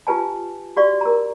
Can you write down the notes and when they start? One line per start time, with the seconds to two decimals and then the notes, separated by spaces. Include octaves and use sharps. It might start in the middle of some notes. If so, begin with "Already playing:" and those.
0.07 F4 G4 B4 G#5 A5
0.77 F#4 G4 D5 F5 C#6
1.01 A#4 A#5